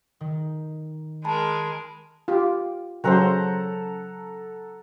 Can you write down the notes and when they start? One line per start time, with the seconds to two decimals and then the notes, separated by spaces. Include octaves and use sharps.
0.21 D#3
1.25 G#3 A#4 G#5 A5 B5
2.28 F4 G4
3.04 C#3 F#3 A4 C5 F#5 A#5